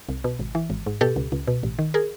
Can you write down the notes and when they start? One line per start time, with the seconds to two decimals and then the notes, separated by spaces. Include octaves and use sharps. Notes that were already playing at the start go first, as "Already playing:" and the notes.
0.09 C2
0.24 B2
0.39 G#1
0.55 E3
0.70 G#1
0.86 G#2
1.01 B2 G4 A4
1.16 C#2
1.32 C#2
1.47 B2
1.63 A1
1.79 D#3
1.94 G#4 A#4